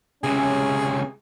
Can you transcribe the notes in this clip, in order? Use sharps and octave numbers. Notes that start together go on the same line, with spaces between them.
C#2 C3 C#4 G#4